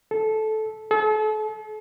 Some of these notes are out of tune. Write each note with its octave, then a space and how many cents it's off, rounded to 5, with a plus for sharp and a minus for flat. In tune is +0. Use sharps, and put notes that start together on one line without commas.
A4 -15
A4 -40